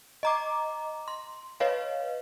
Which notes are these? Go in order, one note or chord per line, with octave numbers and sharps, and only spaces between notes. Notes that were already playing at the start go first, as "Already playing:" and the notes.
D#5 A#5 D6
C6
B4 C#5 D#5 F5